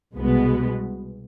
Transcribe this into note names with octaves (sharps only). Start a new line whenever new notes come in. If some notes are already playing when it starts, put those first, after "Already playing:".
C2 B2 G#3 B3